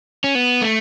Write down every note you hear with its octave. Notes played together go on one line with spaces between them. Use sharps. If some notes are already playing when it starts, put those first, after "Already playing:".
C#4
B3
A3